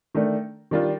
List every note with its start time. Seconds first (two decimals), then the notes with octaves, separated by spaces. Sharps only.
0.14 D#3 A3 D4
0.71 D#3 G3 D4 F4